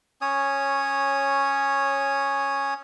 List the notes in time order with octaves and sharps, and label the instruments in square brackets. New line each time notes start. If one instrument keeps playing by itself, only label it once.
[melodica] C#4 C#5 D#6